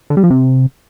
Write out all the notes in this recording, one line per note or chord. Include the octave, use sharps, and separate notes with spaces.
D3
G3
F3
C3